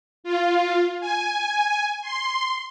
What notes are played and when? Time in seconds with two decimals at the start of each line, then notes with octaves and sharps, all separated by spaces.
0.24 F4
1.00 G#5
2.02 C6